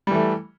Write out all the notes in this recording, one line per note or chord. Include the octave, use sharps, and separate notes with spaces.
E3 G3 A3